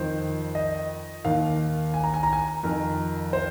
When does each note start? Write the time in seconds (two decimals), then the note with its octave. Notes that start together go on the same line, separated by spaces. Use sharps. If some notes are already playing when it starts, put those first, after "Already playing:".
Already playing: F2 D#3 C5
0.55 D#5
1.24 D#2 D#3 F5
1.94 G#5
2.03 A#5
2.14 G#5
2.23 A#5
2.33 G#5
2.63 F2 D#3 A#4
3.33 C5